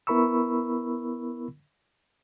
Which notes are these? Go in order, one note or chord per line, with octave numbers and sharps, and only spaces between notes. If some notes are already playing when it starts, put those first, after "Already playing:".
B3 E4 A#4 B5 C#6 E6